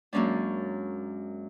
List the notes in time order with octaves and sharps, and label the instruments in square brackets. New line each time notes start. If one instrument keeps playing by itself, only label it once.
[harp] F#2 G#3 A#3 C#4 D4